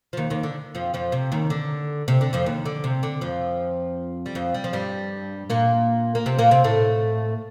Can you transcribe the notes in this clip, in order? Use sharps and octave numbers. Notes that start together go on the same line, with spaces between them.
F3
D#2 D#3
D#2 D#3
D3
F2 F3
F2 F3
C3
D#2 D#3
D3
C3
D3
F2 F3
D#2 D#3
D3
C3
D3
F2 F3
G3
F2 F3
G3
F3
G2 G3
A#2 A#3
A#3
C3 C4
A#2 A#3
C3 C4
A2 A3